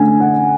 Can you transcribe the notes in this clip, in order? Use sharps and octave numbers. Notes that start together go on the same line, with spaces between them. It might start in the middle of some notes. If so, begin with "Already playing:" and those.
Already playing: D3 A3 C#4 G#5
F#5